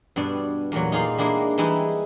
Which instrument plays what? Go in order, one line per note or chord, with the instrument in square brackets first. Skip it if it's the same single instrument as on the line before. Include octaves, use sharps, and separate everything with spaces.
[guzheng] G2 B2 D4 D5
E2 A#2 F#3
D#4 F4 G#4 D5 F5
G#3 A#3 D4 E4 G4
E3 G3 G#3 D#4 E4